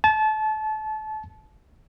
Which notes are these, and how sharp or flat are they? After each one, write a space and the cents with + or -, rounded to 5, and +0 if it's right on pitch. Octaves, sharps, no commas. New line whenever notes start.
A5 -30